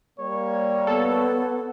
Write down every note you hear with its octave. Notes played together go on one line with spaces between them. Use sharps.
G3 A#3 C#5
B3 A4